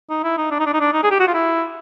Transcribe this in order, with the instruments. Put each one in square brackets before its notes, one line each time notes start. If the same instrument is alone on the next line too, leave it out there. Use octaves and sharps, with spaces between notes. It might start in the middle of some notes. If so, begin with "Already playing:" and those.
[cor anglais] D#4
E4
D#4
D4
D#4
D4
D#4
D4
D#4
G#4
G4
F#4
F4
E4